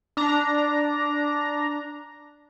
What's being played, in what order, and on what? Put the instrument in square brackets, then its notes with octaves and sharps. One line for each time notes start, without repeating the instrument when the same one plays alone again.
[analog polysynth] D4 A#5